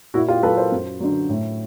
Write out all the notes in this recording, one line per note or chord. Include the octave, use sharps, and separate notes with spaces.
A#2 E4 F#4
F4 G4
F#3 A4 B4
A#4 C5
F#2
D3 F#3
A2